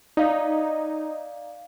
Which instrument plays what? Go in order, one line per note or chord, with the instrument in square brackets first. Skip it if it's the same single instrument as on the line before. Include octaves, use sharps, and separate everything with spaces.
[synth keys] D#4 [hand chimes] D5 F5